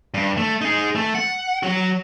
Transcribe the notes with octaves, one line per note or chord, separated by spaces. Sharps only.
G2
A3
D#4 G#4
A3
F#5
F#3 F#4